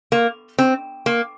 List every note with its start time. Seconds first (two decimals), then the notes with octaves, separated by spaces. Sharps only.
0.12 A#3
0.59 C4
1.06 A#3